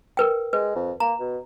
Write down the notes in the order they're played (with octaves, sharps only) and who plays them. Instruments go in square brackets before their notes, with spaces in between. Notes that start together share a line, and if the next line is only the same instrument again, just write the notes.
[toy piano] A#4 B4 G5
[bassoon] G#3 [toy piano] B4
[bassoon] F2
[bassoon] A#3 [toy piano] A#5
[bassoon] B2